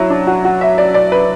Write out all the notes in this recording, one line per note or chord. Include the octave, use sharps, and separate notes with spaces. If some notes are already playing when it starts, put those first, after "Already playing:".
Already playing: F#3 E4
D4
F#4
F#4
E5
D5
D5
B4